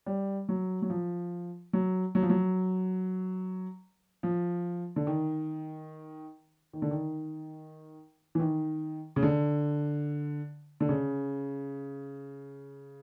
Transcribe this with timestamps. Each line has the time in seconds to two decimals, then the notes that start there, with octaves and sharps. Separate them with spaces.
0.06 G3
0.49 F#3
0.82 F#3
0.90 F3
1.73 F#3
2.15 F#3
2.23 F3
2.30 F#3
4.23 F3
4.96 D3
5.07 D#3
6.73 D#3
6.82 D3
6.91 D#3
8.35 E3
8.40 D#3
9.16 C#3
9.23 D3
10.80 D3
10.89 C#3